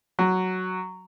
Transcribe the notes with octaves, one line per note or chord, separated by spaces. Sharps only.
F#3